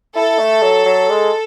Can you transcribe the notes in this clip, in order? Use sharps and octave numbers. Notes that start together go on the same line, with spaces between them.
E4 A4
A3
F#3
F#3
G#3